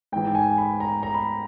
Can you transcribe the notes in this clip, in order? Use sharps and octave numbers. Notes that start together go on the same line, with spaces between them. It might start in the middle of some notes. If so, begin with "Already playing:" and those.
G#2 E3 G5
G#5
B5
A#5
A#5
B5